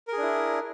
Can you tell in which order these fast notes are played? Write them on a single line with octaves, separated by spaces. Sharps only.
A#4 G#4 D4 E4